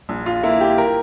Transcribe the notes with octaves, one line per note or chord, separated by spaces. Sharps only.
A#1
F4
A#3 E4
G4
A#4